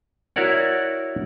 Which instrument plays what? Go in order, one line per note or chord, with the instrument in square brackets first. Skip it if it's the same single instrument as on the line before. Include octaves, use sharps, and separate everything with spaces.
[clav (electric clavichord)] E4 F#4 A#4 C#5 D5 F#5